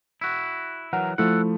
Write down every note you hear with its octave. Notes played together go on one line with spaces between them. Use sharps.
E4 F#4
E3 F#3 A#4 F#5
F3 A3 E4 A4 F#5